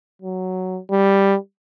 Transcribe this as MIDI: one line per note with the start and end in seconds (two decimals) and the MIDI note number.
0.22 0.79 54
0.91 1.36 55